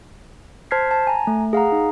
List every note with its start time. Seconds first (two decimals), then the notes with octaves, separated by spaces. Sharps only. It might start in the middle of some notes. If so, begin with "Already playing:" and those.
0.71 C5 A5 F6 G#6 B6 C7
0.91 A5
1.07 G#5 A#5
1.27 A3
1.53 G#4 F5 F#5 A#5
1.72 D#4